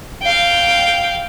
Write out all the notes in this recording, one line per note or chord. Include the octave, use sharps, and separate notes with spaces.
F5 G5